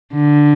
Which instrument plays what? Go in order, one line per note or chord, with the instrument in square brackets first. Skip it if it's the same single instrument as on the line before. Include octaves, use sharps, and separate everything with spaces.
[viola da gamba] D3